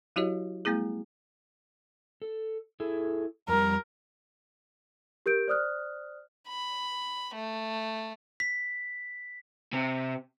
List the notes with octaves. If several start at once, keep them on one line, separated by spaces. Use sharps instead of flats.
F#3 E4 F#4 G4 C#5 D#5
G3 A3 B3 E4 G#4
A4
E4 G#4 A4
F2 G3 A#4
G4 A#4 G6 D7
C5 D5 D#6 F6 F#6
B5
A3
B6
C3